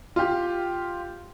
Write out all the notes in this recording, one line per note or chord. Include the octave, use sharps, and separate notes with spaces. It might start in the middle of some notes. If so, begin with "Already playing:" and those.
F4 G4